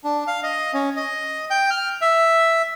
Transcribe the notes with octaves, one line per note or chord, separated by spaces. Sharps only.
D4
F5
D#5
C#4
D#5
G5
F6
E5